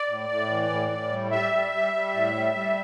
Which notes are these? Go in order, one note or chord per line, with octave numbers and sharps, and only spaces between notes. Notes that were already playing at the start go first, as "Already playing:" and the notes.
Already playing: D5
A2
A2
E3
A2
A2
G3
G3 E5
G3
G3
G3
A2
G3
G3